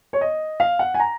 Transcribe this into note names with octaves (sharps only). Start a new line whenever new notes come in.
C#5
D#5
F5
F#5
G#5
A#5